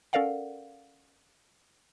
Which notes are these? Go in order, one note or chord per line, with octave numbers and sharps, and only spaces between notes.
C#4 A4 A#4 D5 F5 F#5